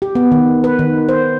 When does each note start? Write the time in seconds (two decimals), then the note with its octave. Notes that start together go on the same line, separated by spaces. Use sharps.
0.02 G4
0.15 B3
0.32 D#3
0.64 B4
0.79 D#3
1.09 C5